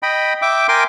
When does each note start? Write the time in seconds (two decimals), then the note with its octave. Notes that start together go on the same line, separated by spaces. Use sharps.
0.03 D#5 G5 B5
0.42 E5 G5 D6
0.68 A#4 G5 G#5 C6 D6